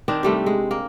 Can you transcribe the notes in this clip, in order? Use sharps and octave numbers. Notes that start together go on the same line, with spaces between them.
D#3 C4 D4
C3 G3 A3
G#3
A#3